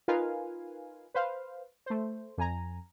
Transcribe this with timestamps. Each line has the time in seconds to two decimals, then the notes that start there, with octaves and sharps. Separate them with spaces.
0.08 D#4 F4 A#4 B4 F5 G#5
1.15 B4 C5 F5
1.86 A3 C5
2.38 F2 G#5 A#5